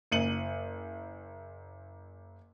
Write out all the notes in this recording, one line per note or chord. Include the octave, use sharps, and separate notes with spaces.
F#1 C#7 D#7 F#7